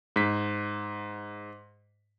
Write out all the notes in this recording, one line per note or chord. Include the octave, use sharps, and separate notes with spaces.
G#2 B6